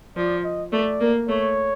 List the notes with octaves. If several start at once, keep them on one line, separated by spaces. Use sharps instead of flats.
F3 D5
D#5
A3 D5
A#3
A3 C#5